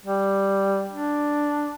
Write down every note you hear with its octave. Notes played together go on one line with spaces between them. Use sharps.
G3
D4